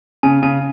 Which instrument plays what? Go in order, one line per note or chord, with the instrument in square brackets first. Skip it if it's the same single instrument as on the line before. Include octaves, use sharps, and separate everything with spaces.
[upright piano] C#3 [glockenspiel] G#5
[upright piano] C#3 [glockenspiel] G#5